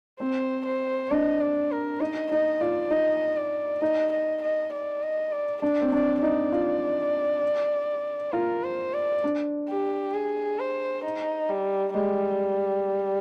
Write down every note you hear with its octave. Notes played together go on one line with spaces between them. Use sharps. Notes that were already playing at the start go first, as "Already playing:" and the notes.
C4 C5
C5
D4 D#5
D5
A#4
D#4 D#5
D#4 D#5
F4 D5
D#4 D#5
D5
D#4 D#5
D#5
D#5
D5
D#5
D5
D4 D5
C4
D4 D5
D#4 D5
F4
F4 A#4
C5
D5
D4
G4
G#4
C5
D#4
G3
G3 G#3